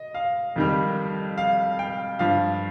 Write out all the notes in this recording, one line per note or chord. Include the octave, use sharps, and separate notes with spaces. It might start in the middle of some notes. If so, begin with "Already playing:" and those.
Already playing: D#5
F5
F2 D#3 G3
F5
G5
G2 F3 F5